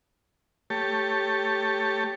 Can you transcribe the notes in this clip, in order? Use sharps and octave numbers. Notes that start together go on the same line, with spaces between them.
A3 G4 C#5 A5